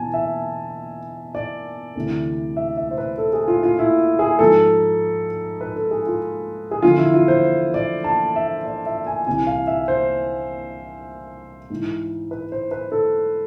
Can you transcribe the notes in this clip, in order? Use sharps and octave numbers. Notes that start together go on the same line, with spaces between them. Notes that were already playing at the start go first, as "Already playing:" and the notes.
Already playing: E2 B2 G#5 A5
E5
D5
D2 C3 E3
E5
E5
C5
B4
A4
G#4
F4
F4
E4
G#4
G#2 F3 A4
B4
A4
G#4
F4
G#4
E2 D3 F3 F4
E4
F4
C5
D5
A5
E5
D5
E5
G#5
C2 C3 E3 G#5
F5
E5
C5
G#2 E3
B4
C5
B4
A4